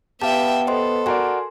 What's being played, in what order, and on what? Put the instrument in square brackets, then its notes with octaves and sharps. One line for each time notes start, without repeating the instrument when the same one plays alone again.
[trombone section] B3 [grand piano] G4 [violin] E5 G5 [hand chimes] F5 A5
[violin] A4 [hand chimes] C5 D#5 C6
[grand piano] F#4 A#4 D5 [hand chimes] G#5 C6